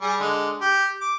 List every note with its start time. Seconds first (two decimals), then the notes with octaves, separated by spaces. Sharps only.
0.02 G3 G#4
0.20 D3 G#3
0.61 G4
1.01 D6